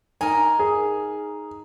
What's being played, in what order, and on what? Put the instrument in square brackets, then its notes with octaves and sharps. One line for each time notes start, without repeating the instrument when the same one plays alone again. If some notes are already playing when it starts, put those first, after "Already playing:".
[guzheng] D#4 A#4 [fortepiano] G#5
[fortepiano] G#4